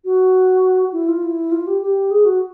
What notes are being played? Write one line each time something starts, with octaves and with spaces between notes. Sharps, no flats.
F#4
E4
F4
E4
F4
G4
G4
G#4
F#4